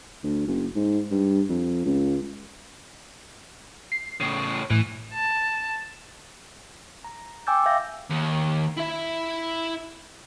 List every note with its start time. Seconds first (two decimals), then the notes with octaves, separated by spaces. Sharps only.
0.24 D2
0.47 F#1
0.76 G#2
1.11 G2
1.49 F2
1.86 C#2
3.92 C7
4.21 A2 C#3
4.71 A2 E3
5.14 A5
7.04 A#5
7.47 G5 G#5 D6 E6 G6 A6
7.66 E5 F5 G6 A6 A#6
8.10 D#2
8.78 E4 E5